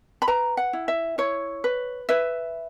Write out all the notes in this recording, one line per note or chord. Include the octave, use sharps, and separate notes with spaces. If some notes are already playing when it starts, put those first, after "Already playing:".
B5
B4 A#5
F#5
E4
E5
E4 C#5
B4
B4 E5